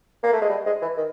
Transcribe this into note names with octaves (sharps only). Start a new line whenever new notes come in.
A#3
A3
G#3
G3
G#3
E3
D#3